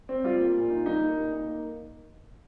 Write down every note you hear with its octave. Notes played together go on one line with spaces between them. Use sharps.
C4
G3 F4
A#3
A#2
D#4
G3 D#4
A#3
A#2
D#4
A#3